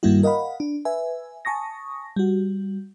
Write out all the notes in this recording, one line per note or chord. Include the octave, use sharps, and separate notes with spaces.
G2 D#3 G3 A#3 E4 F#4
A#4 D#5 F5 F#5 B5
D4
B4 E5 G#5
G#5 A5 C#6 D#6 A#6
G3 F#4